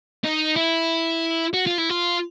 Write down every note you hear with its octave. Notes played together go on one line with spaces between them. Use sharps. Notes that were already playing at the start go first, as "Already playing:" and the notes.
D#4
E4
F#4
F4
E4
F4